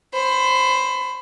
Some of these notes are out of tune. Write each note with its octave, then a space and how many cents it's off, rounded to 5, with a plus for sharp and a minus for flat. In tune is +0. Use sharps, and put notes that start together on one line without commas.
C5 +10 B5 +25